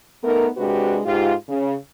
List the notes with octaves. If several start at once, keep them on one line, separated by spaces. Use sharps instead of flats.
A3 B3 D#4 A#4
C3 G#3 D4 F#4 G4 B4
G#2 F4 G4
C#3